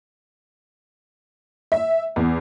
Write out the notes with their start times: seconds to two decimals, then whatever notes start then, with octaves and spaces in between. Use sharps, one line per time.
1.72 E5
2.16 E2